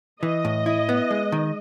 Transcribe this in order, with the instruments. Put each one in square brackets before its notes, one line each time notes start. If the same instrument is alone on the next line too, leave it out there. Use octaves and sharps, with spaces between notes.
[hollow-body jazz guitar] E3 [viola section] D#5
[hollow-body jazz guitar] A2
E4
B3
G#3
D#3